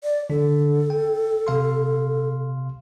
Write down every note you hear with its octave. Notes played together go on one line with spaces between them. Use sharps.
D5
D3 D4 A4
G5
C3 F5 C6